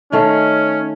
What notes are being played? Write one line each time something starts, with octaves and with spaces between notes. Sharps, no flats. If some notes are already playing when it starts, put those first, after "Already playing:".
D#3 A3 C#4 F5